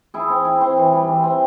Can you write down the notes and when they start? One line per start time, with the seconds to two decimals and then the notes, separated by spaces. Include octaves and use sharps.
0.14 E4 G#4
0.30 C4
0.45 E4
0.61 C4
0.77 E3
0.93 G3
1.08 E3
1.24 C4